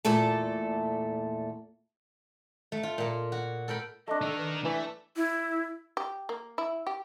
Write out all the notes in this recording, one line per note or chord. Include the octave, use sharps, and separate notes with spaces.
E2 A#2 A3 A4 A5
A3
F4
A#2 A#3
F#4
A4 A#4 G5 B5
A3 D4 D#5
D#4 A4 A#4
B4
E3 A3 E5
E4
G4
A#3
E4
G4